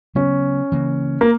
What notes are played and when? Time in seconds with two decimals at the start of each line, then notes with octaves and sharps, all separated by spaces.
0.15 C#3 F#3 B3 C#4
0.72 C#3 E3 A#3
1.21 A#3